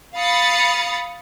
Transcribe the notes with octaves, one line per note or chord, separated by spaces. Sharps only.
F5 B5 D#6 A6 C#7